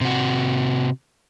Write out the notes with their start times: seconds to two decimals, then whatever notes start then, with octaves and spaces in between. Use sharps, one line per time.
0.01 C3 F#4